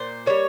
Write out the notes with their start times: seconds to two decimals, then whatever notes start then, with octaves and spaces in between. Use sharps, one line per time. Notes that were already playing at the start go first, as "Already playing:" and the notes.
Already playing: A#2 C5
0.26 G3 A#3 C#5